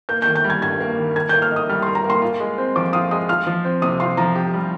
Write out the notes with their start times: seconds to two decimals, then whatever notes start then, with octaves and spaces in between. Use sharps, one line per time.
0.09 A#3 G6
0.22 G6
0.27 D#3
0.36 G6
0.44 G3
0.50 G#6
0.62 G2 G#6
0.80 A#3
0.98 D#3
1.16 A#4 G#6
1.29 G6
1.33 A#3
1.42 F6
1.51 D#4
1.56 D#6
1.69 G3 F6
1.82 C6
1.87 A#4
1.95 A#5
2.05 A#3 C6
2.22 F4
2.40 G#3
2.58 C4
2.76 F3 D6
2.93 F4 D#6
3.11 G#3 D#6
3.29 F4 F6
3.47 F3
3.65 C4
3.82 C3 D#6
4.00 F4 C6
4.17 F3 A#5
4.35 G4
4.53 G3